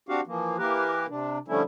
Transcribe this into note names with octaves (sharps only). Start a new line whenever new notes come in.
C4 D4 F#4 G4 F5 F#5
E3 F3 A#3
E3 A#3 G4 A#4 B4
C3 D4
D3 F3 G3 A3 C#4 E4